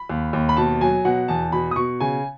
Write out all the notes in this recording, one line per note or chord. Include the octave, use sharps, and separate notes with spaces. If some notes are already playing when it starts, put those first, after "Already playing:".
Already playing: B5
D#2
D#2
B5
B2 A5
F#3 G#5
B2 F#5
E2 A5
B2 B5
D#6
B2 C#6
C#3 G#5